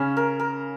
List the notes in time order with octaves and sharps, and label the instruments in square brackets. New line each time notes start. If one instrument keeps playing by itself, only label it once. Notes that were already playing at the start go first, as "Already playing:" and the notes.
Already playing: [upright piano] C#3 [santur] C#4
[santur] A#4
A#4